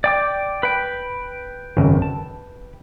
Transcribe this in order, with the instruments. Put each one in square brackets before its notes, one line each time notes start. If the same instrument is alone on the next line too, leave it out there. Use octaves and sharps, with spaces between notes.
[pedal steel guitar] D5 G5 D6
B4 G5
[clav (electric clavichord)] G#1 C#2 F#2
A5